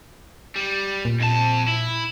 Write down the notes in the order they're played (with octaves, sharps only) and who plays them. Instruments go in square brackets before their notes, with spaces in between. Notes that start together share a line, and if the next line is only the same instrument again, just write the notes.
[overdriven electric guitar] G3
[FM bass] A#2
[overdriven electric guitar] F2 A5
E4